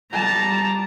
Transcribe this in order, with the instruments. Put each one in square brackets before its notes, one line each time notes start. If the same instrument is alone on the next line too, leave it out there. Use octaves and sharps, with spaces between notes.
[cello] G3 [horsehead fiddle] A5 [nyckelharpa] A#5